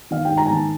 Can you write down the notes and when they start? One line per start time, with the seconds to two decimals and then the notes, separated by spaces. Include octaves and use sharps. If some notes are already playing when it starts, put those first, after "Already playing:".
0.11 D#3 F5
0.25 G5
0.30 G#2
0.38 A#5
0.46 G#5
0.51 D#3 A5